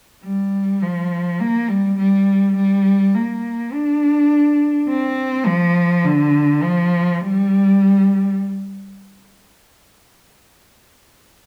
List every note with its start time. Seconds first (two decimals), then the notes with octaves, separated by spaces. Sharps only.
0.24 G3
0.82 F3
1.40 A#3
1.69 G3
1.98 G3
2.56 G3
3.14 A#3
3.72 D4
4.89 C4
5.46 F3
6.05 D3
6.62 F3
7.21 G3